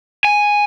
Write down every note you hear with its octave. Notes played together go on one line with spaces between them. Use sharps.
G#5